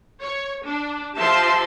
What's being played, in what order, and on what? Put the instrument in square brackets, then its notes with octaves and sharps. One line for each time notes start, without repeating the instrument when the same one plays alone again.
[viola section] C#5
D4
F3 G4 E5 A5 C6